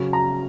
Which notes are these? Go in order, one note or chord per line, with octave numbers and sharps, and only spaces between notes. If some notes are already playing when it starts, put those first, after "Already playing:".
Already playing: C#3 F#3 C#4
A#5